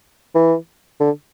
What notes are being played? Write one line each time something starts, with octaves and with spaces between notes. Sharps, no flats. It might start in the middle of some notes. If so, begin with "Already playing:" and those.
E3
D3